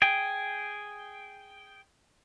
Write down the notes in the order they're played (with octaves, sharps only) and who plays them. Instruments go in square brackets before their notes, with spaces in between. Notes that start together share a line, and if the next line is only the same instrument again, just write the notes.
[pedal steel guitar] G#4 G5